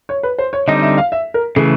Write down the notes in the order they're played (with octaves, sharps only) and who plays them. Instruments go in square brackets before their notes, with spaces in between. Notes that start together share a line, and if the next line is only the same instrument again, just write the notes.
[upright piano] C#5
B4
C5
C#5
[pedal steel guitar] D3 G3 C4 D#4 [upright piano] D#5
[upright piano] E5
F5
E5
A#4
[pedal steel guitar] C#3 E3 A3 [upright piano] G#4